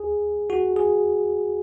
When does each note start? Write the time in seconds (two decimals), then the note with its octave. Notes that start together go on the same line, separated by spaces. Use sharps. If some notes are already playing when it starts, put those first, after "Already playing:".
Already playing: G#4
0.50 F#4
0.76 G#4